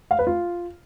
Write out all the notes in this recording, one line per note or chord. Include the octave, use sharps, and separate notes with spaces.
F5
B4
F4